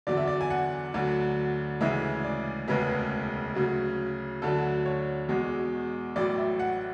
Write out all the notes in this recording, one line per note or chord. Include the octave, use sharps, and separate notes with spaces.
E2 D3 F#3 D5
E5
D5
G#5
F#5
D2 D3 F#3
D2 C#3 E3 G#3 E5
D5
E1 D2 C#3 G#3 B4
D2 C#3 F#3
D2 D3 F#3 A4
C#5
E2 B2 G#3
A1 A2 F#3 D5
E5
F#5